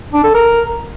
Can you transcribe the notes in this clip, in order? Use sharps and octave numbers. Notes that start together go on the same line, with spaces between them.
D4
A4
A#4